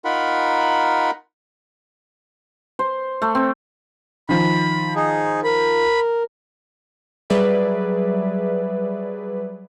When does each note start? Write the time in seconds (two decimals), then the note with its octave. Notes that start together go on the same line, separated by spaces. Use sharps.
0.05 D#4 F4 A#4 F#5 B5
2.79 C5
3.22 A3
3.35 C4
4.29 D#3 F3 B5
4.96 D#4 G#4
5.44 A#4 B5
7.30 F#3 G3 G#4 B4 D5 E5